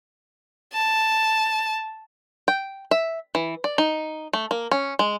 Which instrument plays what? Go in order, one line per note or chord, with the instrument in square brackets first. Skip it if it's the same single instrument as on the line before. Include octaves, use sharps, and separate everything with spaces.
[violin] A5
[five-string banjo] G5
E5
E3
D5
D#4
A3
A#3
C#4
G#3